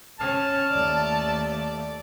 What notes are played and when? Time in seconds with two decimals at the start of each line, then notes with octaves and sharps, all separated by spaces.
0.20 C#4 A5 F6
0.70 D#2 A3 D5